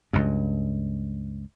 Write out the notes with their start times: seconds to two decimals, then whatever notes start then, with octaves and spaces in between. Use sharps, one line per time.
0.13 C#2 G2